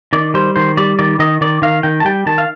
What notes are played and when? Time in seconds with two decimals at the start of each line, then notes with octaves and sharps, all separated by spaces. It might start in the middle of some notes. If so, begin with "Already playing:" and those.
0.13 D#3 D5
0.34 G3 C5
0.56 D#3 C5
0.77 G3 D5
0.99 D#3 D5
1.19 D#3 D#5
1.41 D#3 D5
1.62 D#3 F5
1.83 D#3 G5
2.00 A5
2.05 G3 G5
2.26 D#3 A5
2.38 F5